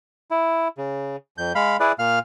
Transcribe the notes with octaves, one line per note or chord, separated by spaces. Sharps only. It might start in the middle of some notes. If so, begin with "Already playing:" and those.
E4
C#3
F2 G6
G#3 F5 B5
E4 G#4 B4 D5
A#2 F5 F6